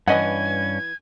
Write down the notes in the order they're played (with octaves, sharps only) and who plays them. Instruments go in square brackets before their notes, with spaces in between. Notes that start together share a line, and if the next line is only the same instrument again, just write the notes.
[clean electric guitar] G2 C#4 [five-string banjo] E3 D#5 F#5 [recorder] G#6